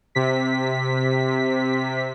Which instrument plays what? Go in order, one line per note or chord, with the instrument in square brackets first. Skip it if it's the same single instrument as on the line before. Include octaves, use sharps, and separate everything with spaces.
[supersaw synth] C3 B6